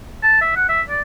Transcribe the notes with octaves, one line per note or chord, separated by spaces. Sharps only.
A5
E5
F#5
E5
D5